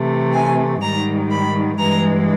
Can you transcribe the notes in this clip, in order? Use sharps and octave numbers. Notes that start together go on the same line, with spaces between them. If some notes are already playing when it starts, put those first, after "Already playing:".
Already playing: C3 E3 A3
G#5
G#2 D#3 G3 A#5
B5
G2 E3 G#3 A#5